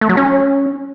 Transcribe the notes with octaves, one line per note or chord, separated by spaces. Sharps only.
A3
F#3
C#4